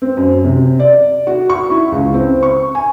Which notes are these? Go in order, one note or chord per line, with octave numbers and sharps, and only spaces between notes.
C4
F#2
C3
D5
F#4
C#6
E4
C#2
C4
C#6
G#5